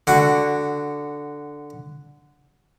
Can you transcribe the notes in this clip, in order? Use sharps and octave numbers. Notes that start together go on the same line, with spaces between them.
D3 F#4